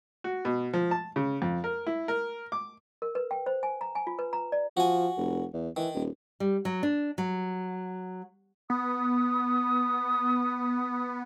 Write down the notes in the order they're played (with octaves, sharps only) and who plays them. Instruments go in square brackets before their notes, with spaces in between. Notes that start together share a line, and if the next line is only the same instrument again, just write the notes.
[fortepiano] F#4
B2
F3
A5
C#3
F2
A#4
E4
A#4
D6
[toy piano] A#4
B4
G5
C5
G#5
A#5
G#5
F4
B4
A#5
D5
[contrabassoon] F3 [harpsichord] F#4 G#5
[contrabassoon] F1
E2
[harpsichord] D#3 [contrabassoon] E3
[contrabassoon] D#1
[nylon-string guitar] G3
F#3
D4
F#3
[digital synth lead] B3 [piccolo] D#6